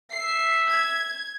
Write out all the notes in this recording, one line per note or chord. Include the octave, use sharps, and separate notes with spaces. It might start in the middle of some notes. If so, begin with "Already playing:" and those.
E5 C7
G#6